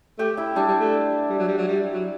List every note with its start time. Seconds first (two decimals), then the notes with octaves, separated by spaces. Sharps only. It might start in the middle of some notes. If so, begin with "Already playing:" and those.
0.19 A3 G4 G5
0.37 E4 E5
0.56 G3 D4 D5
0.68 G3
0.80 A3
1.30 G3
1.39 F#3
1.48 G3
1.58 F#3
1.68 G3
1.94 F#3